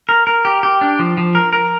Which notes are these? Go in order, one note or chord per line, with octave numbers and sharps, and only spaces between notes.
A#4
A#4
G4
G4
D4
F3
F3
A#4
A#4